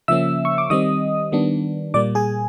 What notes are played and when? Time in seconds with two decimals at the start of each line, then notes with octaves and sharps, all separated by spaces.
0.08 C#3 F3 A#3 C#4 E5 E6
0.45 C#6
0.58 D6
0.70 D#3 G3 C4 D#5 D#6
1.32 D#3 G3 B3 D4
1.94 A#2 G3 A#3 D5 D6
2.15 G#4 G#5